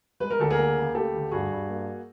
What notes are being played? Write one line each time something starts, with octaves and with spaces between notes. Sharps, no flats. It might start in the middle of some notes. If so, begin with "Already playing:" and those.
G#3 B4
A#4
D2 A4
G#4 A#4
A#3
C#2
A3 G4 A4
D2
G2 F#4 G#4
G2
A#3